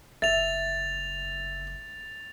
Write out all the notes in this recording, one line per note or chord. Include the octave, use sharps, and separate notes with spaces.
F#1 E5 A6 F7